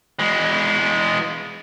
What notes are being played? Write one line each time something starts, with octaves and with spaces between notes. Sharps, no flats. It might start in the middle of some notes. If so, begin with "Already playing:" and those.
E3 G#3